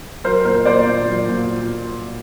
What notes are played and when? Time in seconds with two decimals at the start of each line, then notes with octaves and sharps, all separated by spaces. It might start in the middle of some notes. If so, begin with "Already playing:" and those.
0.24 F#3 A#4 C5
0.45 A#2 A#4 C5
0.65 A#3 C5 D5
0.87 A#2
1.07 F#3
1.29 A#2